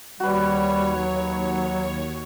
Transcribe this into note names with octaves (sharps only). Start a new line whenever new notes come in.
D#2 G3 F#4 B4 C#5
F#3